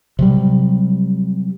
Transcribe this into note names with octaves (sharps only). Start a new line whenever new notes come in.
C3 F#3 G3